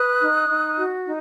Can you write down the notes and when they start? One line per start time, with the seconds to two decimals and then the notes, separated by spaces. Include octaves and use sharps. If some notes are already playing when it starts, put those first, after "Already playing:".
Already playing: B4 D#6 F#6
0.22 D#4
0.49 D#4
0.77 F#4
1.05 D#4